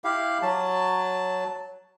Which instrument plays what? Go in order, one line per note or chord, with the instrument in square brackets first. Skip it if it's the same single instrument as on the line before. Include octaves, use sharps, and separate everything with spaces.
[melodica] E4 G4 F5
F#3 A5